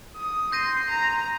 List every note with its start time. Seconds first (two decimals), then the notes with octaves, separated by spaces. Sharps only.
0.16 D#6
0.52 C6 G6 A#6 D#7
0.90 A#5